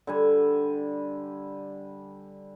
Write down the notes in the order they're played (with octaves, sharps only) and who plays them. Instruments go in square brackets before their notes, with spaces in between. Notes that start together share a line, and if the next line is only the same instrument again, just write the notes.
[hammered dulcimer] D3 G3 G#5